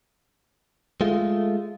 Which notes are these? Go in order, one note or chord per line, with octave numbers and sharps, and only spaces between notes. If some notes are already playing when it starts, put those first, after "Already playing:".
G#3 A3 F4